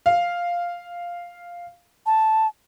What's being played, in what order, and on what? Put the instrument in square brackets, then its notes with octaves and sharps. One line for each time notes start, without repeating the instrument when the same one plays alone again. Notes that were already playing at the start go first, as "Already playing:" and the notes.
[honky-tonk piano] F5
[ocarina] A5